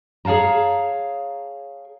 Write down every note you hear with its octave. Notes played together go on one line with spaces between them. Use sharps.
G#4 C#5 F5 A5 A#5